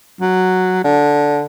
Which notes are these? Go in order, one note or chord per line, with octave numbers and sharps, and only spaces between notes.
F#3
D3